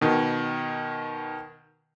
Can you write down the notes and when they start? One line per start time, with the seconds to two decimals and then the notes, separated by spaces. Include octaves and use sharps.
0.01 B2 D#3